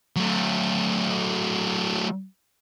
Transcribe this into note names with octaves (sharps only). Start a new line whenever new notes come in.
F#3 A3